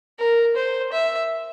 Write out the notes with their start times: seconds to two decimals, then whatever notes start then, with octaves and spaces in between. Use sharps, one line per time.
0.19 A#4
0.55 C5
0.92 E5